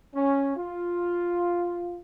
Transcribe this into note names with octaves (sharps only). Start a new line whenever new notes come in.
C#4
F4